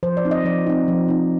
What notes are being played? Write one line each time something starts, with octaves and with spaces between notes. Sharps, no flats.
F3 C5
D5
C4 D#4
D#5
F3 D5
C4 D#4
F3
C4 D#4